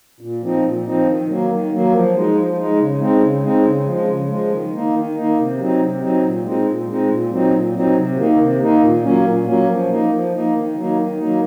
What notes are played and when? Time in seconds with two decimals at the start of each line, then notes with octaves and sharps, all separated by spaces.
0.21 A#2
0.43 F3 C4 D#4
0.64 A#2
0.86 F3 C4 D#4
1.07 D#3
1.28 F#3 A#3
1.50 D#3
1.72 F#3 A#3
1.93 F3
2.15 G#3 D#4
2.36 F3
2.58 G#3 D#4
2.79 C#3
3.01 G#3 C4 D#4
3.22 C#3
3.44 G#3 C4 D#4
3.65 C#3
3.86 F3 G#3
4.08 C#3
4.29 F3 G#3
4.51 D#3
4.73 A#3 D#4
4.94 D#3
5.16 A#3 D#4
5.38 C3
5.59 F#3 C4 D#4
5.80 C3
6.02 F#3 C4 D#4
6.24 A#2
6.45 G#3 C4 D#4
6.66 A#2
6.88 G#3 C4 D#4
7.09 A#2
7.31 F#3 C4 D#4
7.52 A#2
7.75 F#3 C4 D#4
7.96 C3
8.17 D#3 A#3 D#4
8.38 C3
8.60 D#3 A#3 D#4
8.83 A#2
9.04 F#3 A#3 C#4
9.25 A#2
9.46 F#3 A#3 C#4
9.68 F3
9.89 A#3 D#4
10.11 F3
10.33 A#3 D#4
10.55 D#3
10.75 F#3 A#3 D#4
10.97 D#3
11.18 F#3 A#3 D#4